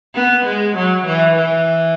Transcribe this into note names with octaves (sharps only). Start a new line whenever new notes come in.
B3
G#3
F#3
E3
E3